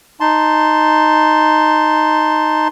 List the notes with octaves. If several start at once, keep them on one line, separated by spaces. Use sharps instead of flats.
D#4 A5 C6